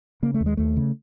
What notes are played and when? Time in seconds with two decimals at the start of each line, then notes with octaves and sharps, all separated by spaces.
0.23 C#3 A#3
0.34 A3
0.41 D#2
0.46 G#3
0.57 D#2 A3
0.77 C#3